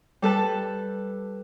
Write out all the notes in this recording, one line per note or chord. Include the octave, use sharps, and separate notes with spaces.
G3 A4 B4 A5